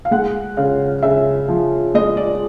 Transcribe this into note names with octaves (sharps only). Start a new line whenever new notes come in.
F5
G#3 F#5
C#3 F5
C#3 E5
F3
G#3 D#5
D5